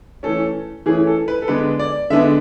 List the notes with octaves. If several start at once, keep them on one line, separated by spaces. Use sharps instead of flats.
E3 A3 C#4 A4
E3 A3 C#4 G#4
A4
B4
A4
D3 G#3 B3 D4 B4
D5
D3 G#3 B3 D4 E5